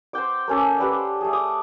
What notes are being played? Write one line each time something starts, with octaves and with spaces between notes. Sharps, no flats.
C5 F#5 G5 D6
A#3 C#4 A4
G4 B4 D5 F#5
C5
A3 G#4
D6 D#6